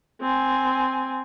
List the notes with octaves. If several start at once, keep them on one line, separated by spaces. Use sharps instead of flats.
C4 G#5